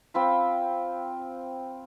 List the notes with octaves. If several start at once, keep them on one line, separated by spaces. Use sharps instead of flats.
C4 F4 B5